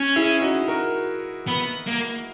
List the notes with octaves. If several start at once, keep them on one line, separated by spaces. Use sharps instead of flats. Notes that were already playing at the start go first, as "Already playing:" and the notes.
Already playing: C#4
E4 G#4
D#4 F#4
F#4 A#4
B3
A#3